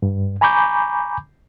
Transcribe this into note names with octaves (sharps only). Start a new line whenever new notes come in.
G2
G#5 A#5 B5 C#6 D6 G6